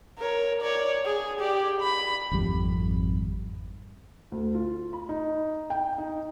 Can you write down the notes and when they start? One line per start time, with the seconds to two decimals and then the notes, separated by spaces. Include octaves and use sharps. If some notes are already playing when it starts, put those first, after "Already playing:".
0.18 A#4 C#5
0.61 C#5 D5
1.05 G#4
1.40 G4 D5
1.80 B5
2.32 G#1 F2 G3
4.32 D2
4.55 F4
4.93 B5
5.09 D#4
5.70 G5
5.98 D#4